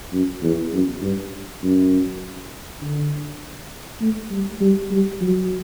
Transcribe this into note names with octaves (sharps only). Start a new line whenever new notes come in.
F#2
E2
F#2
G2
F#2
D3
A3
G3
G3
G3
F#3